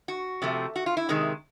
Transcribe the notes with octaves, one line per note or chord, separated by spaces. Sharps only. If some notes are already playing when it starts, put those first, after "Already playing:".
F#4
C3 F3 A3
F#4
F4
E4
C3 D#3 G#3